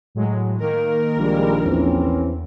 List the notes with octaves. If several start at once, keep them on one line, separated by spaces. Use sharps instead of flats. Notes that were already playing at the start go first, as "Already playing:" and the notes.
A2 F#3 G#3
D#3 A#3 A#4
A#1 A#2 G3 G#3
E2 E3 C4 C#4